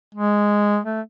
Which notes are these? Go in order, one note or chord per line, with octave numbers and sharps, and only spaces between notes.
G#3
A3